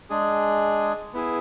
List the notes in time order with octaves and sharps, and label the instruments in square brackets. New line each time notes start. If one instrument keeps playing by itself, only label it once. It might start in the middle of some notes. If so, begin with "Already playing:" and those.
[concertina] G#3 D4 G#4
B3 E4 G#4